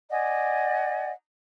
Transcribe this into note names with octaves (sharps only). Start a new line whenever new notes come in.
D5 D#5 F#5 G#5